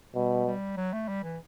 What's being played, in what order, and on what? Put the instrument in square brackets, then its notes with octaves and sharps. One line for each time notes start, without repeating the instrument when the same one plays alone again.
[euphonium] B2 [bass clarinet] G3
[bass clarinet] G3
F#3
A3
G3
E3